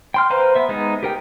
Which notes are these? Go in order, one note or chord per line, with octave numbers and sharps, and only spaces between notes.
G5 C6 F6
B4 C5 F5 A#5
B3 E5
G#3 B3 D#4
G4 A#4 G5